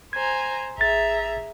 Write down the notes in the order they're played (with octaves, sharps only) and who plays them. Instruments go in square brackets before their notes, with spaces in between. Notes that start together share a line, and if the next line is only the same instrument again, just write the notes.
[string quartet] C5 G#5 A#5 [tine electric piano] G#6
[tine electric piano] A1 A6 [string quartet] G#4 E5 A#5